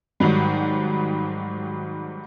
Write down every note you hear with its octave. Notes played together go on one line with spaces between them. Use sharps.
G#2 D#3 F#3 G3